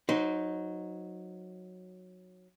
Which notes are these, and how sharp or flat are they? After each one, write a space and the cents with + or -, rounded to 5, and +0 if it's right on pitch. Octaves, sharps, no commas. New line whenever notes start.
F#3 -15 D#4 +0 C5 -30